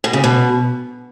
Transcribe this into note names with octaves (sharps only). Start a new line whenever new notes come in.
B2
C#3
B2